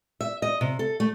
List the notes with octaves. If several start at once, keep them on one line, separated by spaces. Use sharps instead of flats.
E5
D#5
C3
A4
A3